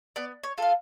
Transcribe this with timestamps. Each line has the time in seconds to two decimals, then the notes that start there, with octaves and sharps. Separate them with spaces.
0.16 B3 D5
0.43 C#5
0.58 F4 A4 F5